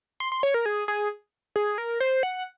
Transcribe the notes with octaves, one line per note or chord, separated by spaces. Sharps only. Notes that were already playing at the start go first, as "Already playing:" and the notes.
C6
C6
C#5
A#4
G#4
G#4
G#4
A#4
C5
F#5